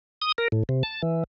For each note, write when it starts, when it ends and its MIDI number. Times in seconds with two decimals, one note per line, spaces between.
0.22 0.32 87
0.38 0.48 70
0.52 0.63 45
0.69 0.83 48
0.83 1.02 81
1.02 1.24 52